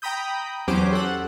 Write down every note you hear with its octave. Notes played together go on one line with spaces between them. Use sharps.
G5 A#5 B5 D#6 G6
E2 F#3 C#4 G4 C5 D6
A4 F#5